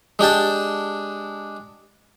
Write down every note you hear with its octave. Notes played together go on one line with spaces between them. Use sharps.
G#3 D4 G4 A5